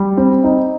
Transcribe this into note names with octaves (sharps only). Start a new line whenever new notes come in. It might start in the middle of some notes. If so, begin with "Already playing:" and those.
Already playing: G3
C4
D#4